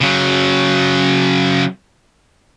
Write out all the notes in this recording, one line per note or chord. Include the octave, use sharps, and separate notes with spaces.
C#3 F#3